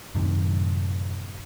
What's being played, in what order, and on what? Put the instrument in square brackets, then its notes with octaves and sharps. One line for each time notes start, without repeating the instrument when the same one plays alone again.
[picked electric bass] F#2 A2 C3 D#3